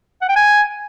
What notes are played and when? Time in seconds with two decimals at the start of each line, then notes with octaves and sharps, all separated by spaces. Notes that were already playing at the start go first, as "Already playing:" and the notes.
0.22 F#5
0.29 G5
0.36 G#5